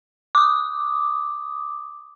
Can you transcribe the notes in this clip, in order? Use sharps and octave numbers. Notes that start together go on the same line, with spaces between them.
D6 D#6